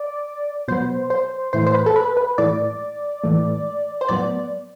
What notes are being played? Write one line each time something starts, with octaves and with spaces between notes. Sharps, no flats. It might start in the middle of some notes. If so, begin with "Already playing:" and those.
Already playing: D5
B2 F#3 B3 C5
C5
A2 E3 A3 C5
C5
B4
A4
B4
B4
A2 E3 A3 D5
A2 E3 A3
C5
A2 F#3 B3 D5